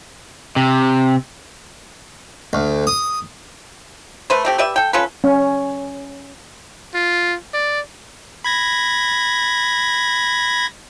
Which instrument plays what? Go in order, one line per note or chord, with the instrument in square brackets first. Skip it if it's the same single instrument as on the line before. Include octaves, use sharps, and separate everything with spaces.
[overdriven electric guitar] C3
[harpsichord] D2
D#6
[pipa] A3 B4 C5
A3 C4 G4
G4 B4 D5 E5
A4 G5
C#4 F4 A4 B4
[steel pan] C#4
[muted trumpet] F4
D5
[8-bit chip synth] B5 G#6 A#6